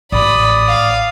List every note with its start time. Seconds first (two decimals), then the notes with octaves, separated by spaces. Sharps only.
0.12 A1 D5 B5 D#6
0.68 F5